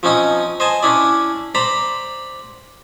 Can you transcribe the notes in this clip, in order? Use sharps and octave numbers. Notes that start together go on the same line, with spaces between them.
F3 C4 C#4 D#4 D#5 D#6
C5 D#5 G#5 A5
C#4 D4 E4 D5
C5 D5 A#5 B5